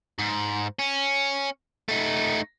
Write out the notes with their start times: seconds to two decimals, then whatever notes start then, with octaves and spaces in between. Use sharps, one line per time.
0.19 G#2
0.79 C#4
1.89 A3 D#4